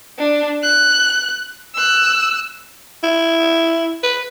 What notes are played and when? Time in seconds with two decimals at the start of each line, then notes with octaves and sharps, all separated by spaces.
0.19 D4
0.63 F#6
1.75 E6 F#6
3.03 E4
4.03 B4